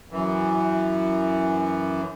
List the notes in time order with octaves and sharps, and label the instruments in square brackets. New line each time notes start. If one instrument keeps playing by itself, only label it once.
[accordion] F#2 E3